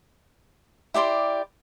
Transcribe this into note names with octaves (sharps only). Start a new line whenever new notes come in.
E4 G4 D5 C6